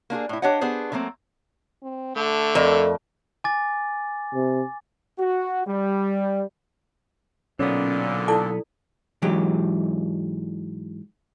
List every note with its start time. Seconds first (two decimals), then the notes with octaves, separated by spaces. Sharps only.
0.10 A#3 D4 F4 G#4
0.29 A2 E4
0.42 D4 G4 C#5 D#5 F#5
0.61 B3 D4 G#4 C5
0.92 D3 F#3 A3 A#3 C4
1.83 C4
2.16 D3 A3
2.55 F2 A4 A#4 D5
3.44 G#5 D6 A6
4.34 C3
5.18 F#4
5.67 G3
7.59 B1 A#2 D3 B3 C#4
8.28 E4 A4 D5 A5
9.22 G#2 E3 F#3 G4